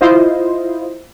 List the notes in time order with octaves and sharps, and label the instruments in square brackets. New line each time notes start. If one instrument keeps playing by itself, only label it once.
[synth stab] E4 F4 C5 D#5